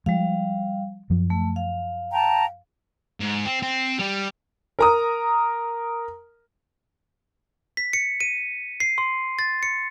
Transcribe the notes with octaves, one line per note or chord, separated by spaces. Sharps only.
F3 G3 G#3 F5
F#2 F3
A3
F5
G5 A5 A#5
G#2
C4
C4
G3
A#4 A#5 D#6
B6
C#7
D#7
C7
C6
A6
C#7